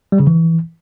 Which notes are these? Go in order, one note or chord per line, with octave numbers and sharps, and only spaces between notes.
G3
C#3
E3